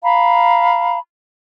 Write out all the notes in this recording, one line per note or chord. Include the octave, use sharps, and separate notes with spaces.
F5 A#5 B5